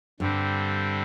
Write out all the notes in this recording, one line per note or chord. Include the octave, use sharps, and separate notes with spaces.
G2 D3 G3 C4